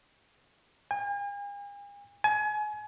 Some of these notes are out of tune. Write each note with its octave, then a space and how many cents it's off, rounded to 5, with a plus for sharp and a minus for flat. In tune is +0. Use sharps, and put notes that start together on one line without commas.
G#5 -45
G#5 +30